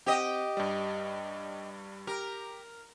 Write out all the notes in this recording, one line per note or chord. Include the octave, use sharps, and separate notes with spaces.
C4 G4 D#5 F#5
G2 G3
G4 A#4 A#5